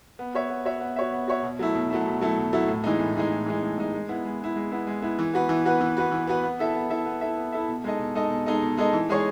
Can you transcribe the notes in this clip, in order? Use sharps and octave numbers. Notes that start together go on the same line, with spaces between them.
B3
F#4 C#5 E5
B3
F#4 C#5 E5
B3
F#4 C#5 E5
B3
F#4 C#5 E5
B2
F#3 A3 E4
B2
F#3 A3 E4
B2
F#3 A3 E4
B2
F#3 A3 E4
A2
E3 G#3 D#4
A2
E3 G#3 D#4
A2
E3 G#3 D#4
A2
E3 G#3 D#4
G#3
B3 E4
G#3
B3 E4
G#3
B3 E4
G#3
B3 E4
E3
B3 F#4 B4
E3
B3 F#4 B4
E3
B3 F#4 B4
E3
B3 F#4 B4
B3
E4 A4 E5
B3
E4 A4 E5
B3
E4 A4 E5
B3
E4 A4 E5
B2
G#3 D#4 A4 D#5
B2
G#3 D#4 A4 D#5
B2
G#3 D#4 A4 D#5
B2
G#3 D#4 A4 D#5
E3
G#3 D#4 G#4 C#5